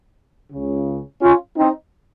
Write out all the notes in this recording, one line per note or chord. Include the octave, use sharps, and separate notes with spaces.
C#2 C#3
C#4 F4
C4 D#4